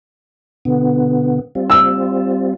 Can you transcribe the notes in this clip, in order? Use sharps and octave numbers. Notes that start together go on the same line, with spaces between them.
B2 D3 B3
G3 C4 F4
E6